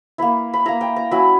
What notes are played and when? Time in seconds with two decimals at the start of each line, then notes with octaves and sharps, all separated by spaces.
0.18 A#3 E4 B5
0.54 B5
0.65 A#3 E4 A#5
0.81 G5
0.96 A#5
1.11 F#3 C#4 E4 B5